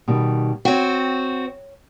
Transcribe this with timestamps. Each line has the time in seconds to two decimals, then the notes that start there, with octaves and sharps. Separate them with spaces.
0.08 B2 D#3 G3
0.65 C4 F#4 C#5 G5